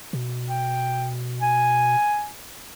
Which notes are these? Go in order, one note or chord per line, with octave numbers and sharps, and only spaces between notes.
B2
G5
G#5